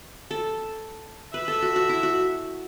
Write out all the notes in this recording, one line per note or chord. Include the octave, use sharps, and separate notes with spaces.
A4
B4 E5
A4
F#4
F#4
E4
F#4